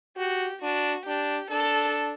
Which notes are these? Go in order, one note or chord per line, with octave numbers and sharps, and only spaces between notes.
F#4 G4
D4 F#4
D4 G4
D4 A4